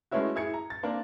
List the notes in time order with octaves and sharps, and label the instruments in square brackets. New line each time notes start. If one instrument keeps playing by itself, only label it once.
[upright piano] G#3 A3 B3 C#4 E4 F#4
E4 G#4 G#6 C#7
A#5
A6
A#3 C4 D4 A#4